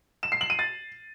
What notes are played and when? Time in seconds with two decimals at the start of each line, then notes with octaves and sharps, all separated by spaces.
0.23 E7
0.32 C7
0.41 F#7
0.50 D#7
0.59 A6